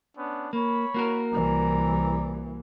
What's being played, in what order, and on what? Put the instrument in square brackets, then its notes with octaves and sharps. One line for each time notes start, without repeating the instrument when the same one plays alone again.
[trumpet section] B3 C#4 D4
[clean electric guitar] A#3 [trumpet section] C#5 B5
[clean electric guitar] A#3 F#4 A#4
[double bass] C2 E3 [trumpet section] D5 A#5